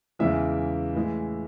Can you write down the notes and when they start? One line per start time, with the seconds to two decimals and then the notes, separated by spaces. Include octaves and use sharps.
0.19 E2 C#3 E3 G#3 E5
0.95 A2 E3 G#3